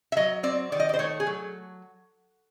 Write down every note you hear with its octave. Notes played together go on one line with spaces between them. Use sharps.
E5
F#3 D#5
C4 D5
D#3 D5
D#5
D5
C5
A3 C#5
G#4
F#3